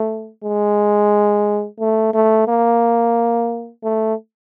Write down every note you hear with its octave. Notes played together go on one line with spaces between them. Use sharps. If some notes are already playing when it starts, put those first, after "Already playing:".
Already playing: A3
G#3
A3
A3
A#3
A3